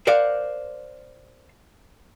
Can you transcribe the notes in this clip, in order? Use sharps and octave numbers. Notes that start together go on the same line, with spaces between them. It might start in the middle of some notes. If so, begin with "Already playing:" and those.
A#4 C5 D5 F5 F#5